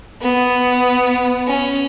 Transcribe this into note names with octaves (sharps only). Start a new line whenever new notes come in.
B3
C#4